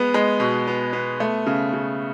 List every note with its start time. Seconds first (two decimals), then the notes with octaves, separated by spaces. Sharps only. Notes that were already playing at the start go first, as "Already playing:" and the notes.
Already playing: G#3 B3
0.14 G#3
0.40 B2
0.67 B3
0.93 B3
1.20 A3
1.47 C#3
1.73 C#3